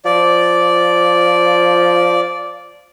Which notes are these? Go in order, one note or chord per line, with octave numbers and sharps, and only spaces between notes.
F3 D5